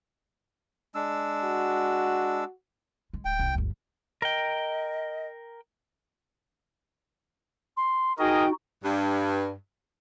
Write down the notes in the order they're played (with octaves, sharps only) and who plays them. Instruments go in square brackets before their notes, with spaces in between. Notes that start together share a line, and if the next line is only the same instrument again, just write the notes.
[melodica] G#3 D4 E6
[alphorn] F#4
[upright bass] G#3
[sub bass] D1 [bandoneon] G5
[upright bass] C2
[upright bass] G1 F3 [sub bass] D2
[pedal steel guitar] A#4 G5 [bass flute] D#5
[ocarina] C6
[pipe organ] D#4 F#4 [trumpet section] G#4 A#4 D#5 [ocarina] G5
[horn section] G2